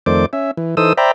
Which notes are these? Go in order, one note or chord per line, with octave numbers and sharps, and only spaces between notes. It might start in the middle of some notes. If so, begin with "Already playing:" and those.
F2 D#3 A3 C5 D5 D6
C#4 E5
E3
E3 D#4 A4 C5 D#6 E6
C5 D5 E5 G5 A#5 B5